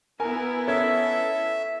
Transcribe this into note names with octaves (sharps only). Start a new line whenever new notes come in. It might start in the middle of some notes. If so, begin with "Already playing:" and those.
B3 E4 A#4 G#5
C#4 A4 E5 G#6